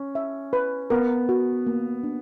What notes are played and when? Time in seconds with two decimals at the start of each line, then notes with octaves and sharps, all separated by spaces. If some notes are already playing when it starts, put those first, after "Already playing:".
Already playing: C#4
0.15 E5
0.53 B4
0.90 B3 A#4
1.29 F#4
1.67 A#3
2.03 D4